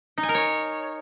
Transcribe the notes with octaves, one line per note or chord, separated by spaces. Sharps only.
D#4
G#5
A#4
C#5